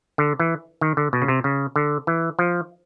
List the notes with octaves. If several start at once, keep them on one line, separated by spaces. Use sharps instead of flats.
D3
E3
D#3
D3
B2
C#3
C3
C#3
D3
E3
F3